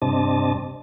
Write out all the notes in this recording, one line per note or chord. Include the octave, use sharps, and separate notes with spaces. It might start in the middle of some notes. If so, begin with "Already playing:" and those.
G2 C3 C4 D4 D#5 A5